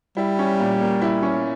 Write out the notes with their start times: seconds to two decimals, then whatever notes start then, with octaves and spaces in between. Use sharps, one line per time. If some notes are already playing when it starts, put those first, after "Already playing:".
0.17 G3 E4
0.39 C#4
0.60 A#2
0.81 A#3
1.02 E4
1.23 C#4